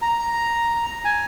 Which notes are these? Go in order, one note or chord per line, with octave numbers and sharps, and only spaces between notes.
A#5
G#5